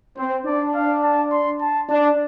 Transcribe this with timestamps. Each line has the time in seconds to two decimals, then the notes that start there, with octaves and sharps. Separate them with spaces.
0.17 C4 C5
0.45 D4 D5
0.75 F5
1.03 A5
1.31 C6
1.61 A5
1.89 D4 A5